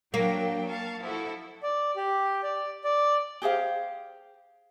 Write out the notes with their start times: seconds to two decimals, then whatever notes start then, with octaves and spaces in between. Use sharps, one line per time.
0.14 F#3 A#3 D4 G5
0.68 F5 A5 C#6
1.02 F3 E4 F#4 A4
1.63 D5
1.96 G4
2.43 D5
2.84 D5
3.42 G4 G#4 C5 F5